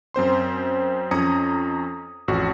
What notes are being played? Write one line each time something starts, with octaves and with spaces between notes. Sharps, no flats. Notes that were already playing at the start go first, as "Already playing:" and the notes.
F#2 C4 C5 C6
F2 C#4 A#5 D#6 G#6 C#7
A1 F2 F#4